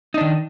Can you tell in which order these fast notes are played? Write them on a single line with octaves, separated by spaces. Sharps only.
D#4 D4 D#3